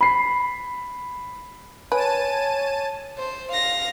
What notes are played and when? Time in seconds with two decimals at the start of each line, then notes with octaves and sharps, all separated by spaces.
0.01 B5 C7
1.92 B4 C#5 G#5 A5 D#7
3.18 C5
3.52 F5 A#6